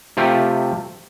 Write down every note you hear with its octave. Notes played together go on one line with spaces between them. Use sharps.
C3 A3 F4 G4